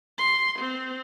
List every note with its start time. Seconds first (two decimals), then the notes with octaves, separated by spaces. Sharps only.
0.18 C6
0.59 C4